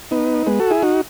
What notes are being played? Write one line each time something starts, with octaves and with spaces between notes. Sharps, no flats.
B3 D#4
G#3 B3
F#4 A4
E4 G#4
D#4 F#4